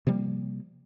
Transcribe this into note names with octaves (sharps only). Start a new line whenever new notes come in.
C3 F3 G3 A#3